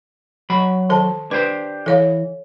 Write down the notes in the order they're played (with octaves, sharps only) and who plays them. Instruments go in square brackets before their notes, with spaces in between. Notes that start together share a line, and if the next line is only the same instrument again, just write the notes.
[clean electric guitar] F#3 B5
[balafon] D#3 A4 A5
[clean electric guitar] D4 G4 C5 [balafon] B4
[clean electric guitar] E3 [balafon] A4 C#5 F5